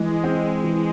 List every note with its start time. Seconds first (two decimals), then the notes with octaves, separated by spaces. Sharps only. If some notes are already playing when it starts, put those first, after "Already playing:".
Already playing: E3 G#3
0.24 C4
0.64 E3